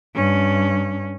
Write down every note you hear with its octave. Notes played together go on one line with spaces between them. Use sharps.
G2 C#4